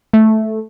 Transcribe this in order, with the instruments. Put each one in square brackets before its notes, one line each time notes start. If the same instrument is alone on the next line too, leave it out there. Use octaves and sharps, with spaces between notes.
[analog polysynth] A3